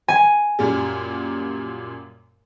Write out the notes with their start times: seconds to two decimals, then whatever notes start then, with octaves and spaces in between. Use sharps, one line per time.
0.08 G#5
0.59 F#2 A#2 G3